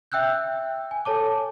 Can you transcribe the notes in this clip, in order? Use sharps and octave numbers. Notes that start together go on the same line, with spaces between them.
E5 G5 E6 F#6 G6
G#5
A4 C#5 A5 D6